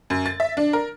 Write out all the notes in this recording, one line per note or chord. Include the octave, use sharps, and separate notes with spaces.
F#2
A6
E5
D4
A#4